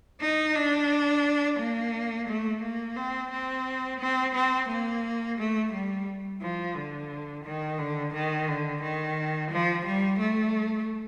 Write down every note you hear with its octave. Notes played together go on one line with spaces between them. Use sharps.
D#4
D4
A#3
A3
A#3
C4
C4
C4
C4
A#3
A3
G3
F3
D3
D#3
D3
D#3
D3
D#3
F3
G3
A3